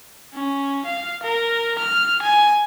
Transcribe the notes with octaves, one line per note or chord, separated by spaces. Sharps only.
C#4
F5
A#4
F6
G#5